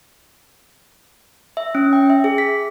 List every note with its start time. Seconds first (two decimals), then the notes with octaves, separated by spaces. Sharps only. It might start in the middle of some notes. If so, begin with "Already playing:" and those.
1.57 E5
1.75 C#4
1.93 G5
2.10 E5
2.24 G#4
2.38 B6